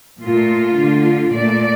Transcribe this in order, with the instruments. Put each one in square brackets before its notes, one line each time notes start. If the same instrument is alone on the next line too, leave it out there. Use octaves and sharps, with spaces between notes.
[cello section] A#2 A3 F4
D3 A3
A#2 A3 D5